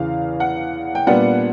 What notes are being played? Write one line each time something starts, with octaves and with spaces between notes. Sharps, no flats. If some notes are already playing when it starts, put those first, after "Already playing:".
Already playing: E2 C#3 E3 F5
F#5
G5
A#2 G3 B3 D4 F#5